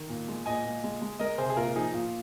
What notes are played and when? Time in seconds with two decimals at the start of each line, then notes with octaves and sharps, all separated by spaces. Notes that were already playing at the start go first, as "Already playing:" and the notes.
Already playing: D#3
0.09 A#2
0.28 G#3
0.46 A#2 D#5 G#5
0.65 A#2
0.84 G#3
1.02 G#3
1.19 G#3 A#4 D#5
1.38 C3 G#4 C5
1.50 G#4
1.57 A#2 F4 A#4
1.75 F3 D#4 G#4
1.93 A#2 F4